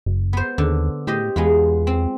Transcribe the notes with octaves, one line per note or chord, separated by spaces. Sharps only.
F#1
B3 C5
D#2 D3
A2 G4 C5 D#5
E2 G#3 B3 F4
C4